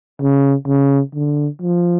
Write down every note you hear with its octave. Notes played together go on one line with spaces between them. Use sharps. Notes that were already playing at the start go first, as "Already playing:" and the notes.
C#3
C#3
D3
F3